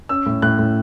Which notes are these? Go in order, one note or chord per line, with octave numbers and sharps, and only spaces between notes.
C#4 E6
A2
A2 F#6
A2